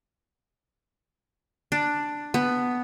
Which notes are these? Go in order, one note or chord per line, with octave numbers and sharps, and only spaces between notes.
D4
B3